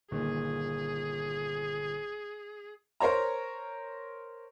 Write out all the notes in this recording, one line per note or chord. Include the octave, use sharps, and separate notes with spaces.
G1 A#2 D#3 G#4
A#4 C5 C#5 A#5